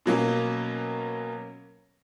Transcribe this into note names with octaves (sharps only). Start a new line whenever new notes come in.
B2 F#3 A#3 C#4